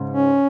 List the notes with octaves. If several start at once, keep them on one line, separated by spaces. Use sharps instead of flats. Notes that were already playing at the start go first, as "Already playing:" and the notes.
Already playing: G#2 C#3
C#4